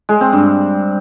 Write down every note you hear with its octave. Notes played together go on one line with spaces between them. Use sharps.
G#3
C4
G2